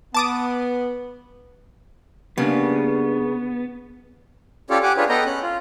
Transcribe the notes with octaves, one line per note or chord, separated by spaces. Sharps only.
B3 A5 D6 D#6
C#3 G3 A#3 B3 D4
C#4 F4 G4 A4 C#5 D5
G4 F#5 G#5 D6
D4 F4 G#4 B4 C#5
B3 A4 B4 D#5 G5 A#5
C#4 F#6
F4